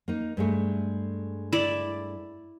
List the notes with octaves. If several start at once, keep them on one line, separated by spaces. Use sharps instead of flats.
A#3 D#4
G2 G#3 A3
E4 D5